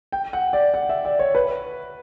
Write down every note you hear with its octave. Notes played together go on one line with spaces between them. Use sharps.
G5
F#5
D5
F#5
E5
D5
C#5
B4